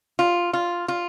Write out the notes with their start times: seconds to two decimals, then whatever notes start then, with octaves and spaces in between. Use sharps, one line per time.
0.19 F4
0.53 F4
0.88 F4